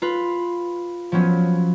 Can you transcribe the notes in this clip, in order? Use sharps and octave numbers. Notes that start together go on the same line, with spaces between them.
F4 B4 B5
F3 F#3 B3 C#4